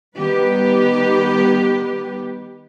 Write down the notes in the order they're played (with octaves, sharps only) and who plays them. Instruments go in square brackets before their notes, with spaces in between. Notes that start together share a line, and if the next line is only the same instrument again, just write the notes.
[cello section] D#3 G3 B3 G4 B4